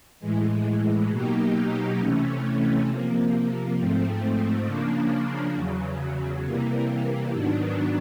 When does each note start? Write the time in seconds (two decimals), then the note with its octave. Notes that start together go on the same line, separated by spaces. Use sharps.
0.20 A2 E3 G#3
1.09 B2 F#3 A#3 D#4 G4
1.98 C3 E3 A3 C#4
2.87 C3 F3 A#3
3.76 G#2 F3 A3 C4
4.65 C#3 F3 A#3 D4
5.54 E2 C#3 F#3
6.43 C3 E3 G3 A#3
7.32 G#2 D#3 F#3 B3 D4